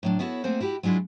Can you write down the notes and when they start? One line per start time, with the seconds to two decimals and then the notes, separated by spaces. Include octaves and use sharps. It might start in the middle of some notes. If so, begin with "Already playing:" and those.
0.03 A2 F#3 D4
0.19 B3 E4 F#4 A4 C#5
0.44 A3 A#3 C4 G#4 C5 F#5
0.61 E4 F#4 G4
0.83 F#3 G#3 D4 E4 F4